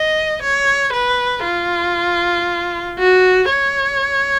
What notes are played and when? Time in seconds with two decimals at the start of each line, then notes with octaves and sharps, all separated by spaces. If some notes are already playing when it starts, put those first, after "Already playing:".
Already playing: D#5
0.43 C#5
0.93 B4
1.44 F4
2.99 F#4
3.49 C#5